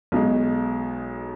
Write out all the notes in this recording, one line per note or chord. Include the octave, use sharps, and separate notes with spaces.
B1 B2 G#3